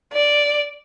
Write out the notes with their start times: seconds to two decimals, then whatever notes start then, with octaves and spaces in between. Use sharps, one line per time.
0.13 D5